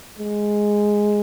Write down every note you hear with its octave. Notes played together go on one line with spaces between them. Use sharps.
G#3